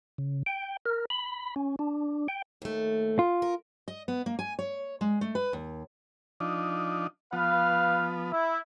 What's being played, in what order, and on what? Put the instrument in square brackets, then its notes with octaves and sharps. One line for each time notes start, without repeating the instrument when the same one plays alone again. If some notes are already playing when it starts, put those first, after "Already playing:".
[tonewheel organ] C#3
G5
A#4
B5
C#4
D4
G5
[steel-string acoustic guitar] D#2 A3
[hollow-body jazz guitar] F4
[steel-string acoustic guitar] A#4
D#5
B3
A#3
G#5
C#5
G#3
A3
B4
D#2
[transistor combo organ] F3 D4 D#4
[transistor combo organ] F3 B3 [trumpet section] B4 F5
[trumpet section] E4